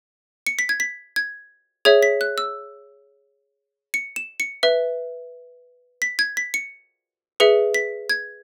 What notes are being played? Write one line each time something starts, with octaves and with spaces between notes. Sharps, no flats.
C#7
B6
G#6
B6
G#6
G#4 C#5 E5 G#6
B6
F#6
E6
C#7
E7
C#7
B4 E5
B6
G#6
B6
C#7
G#4 B4 E5 C#7
B6
G#6